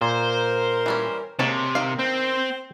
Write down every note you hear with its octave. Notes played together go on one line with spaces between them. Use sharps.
A#2 A#4 C5
E3 G3 C#4
C3 G#3 A#3 C#5 A5
D#3 F5
C4 C5